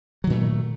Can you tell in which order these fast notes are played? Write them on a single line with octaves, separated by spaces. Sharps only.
F#3 D#3 A#2 A3